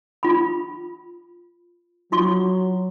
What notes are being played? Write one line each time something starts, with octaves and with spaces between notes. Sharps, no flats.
F4 B5
F#3 F4 C6 C#6